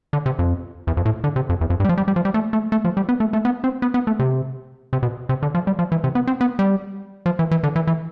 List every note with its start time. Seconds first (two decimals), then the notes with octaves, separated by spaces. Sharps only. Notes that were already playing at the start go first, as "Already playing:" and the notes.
0.13 D3
0.26 C3
0.39 F2
0.87 E2
0.97 F2
1.05 A2
1.24 D3
1.36 C3
1.49 F2
1.61 E2
1.70 F2
1.80 G2
1.85 G3
1.89 F3
1.98 G3
2.08 G3
2.16 F3
2.25 G3
2.34 A3
2.53 A3
2.72 A3
2.85 F3
2.97 G3
3.09 B3
3.20 A3
3.33 A3
3.45 B3
3.64 C4
3.82 B3
3.94 B3
4.07 A3
4.19 C3
4.93 C3
5.03 B2
5.29 C3
5.43 D3
5.55 F3
5.67 G3
5.79 F3
5.92 E3
6.04 C3
6.15 B3
6.27 C4
6.41 B3
6.59 G3
7.26 F3
7.39 E3
7.51 E3
7.63 D3
7.76 E3
7.87 E3